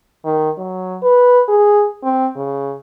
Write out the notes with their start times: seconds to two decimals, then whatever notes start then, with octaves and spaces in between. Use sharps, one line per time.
0.25 D#3
0.58 F#3
1.02 B4
1.48 G#4
2.04 C4
2.36 C#3